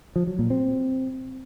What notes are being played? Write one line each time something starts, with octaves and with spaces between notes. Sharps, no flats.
F3
F#3
A#2
C4